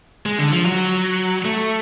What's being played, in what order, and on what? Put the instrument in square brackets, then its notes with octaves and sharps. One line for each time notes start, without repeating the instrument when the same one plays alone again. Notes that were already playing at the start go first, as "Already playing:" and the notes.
[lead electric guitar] G#3
D3
F3
F#3
A3